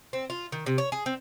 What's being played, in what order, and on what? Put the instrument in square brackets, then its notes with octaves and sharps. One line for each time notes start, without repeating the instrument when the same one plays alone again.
[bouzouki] C4
F4
D#3
C3
C#5
G#4
C4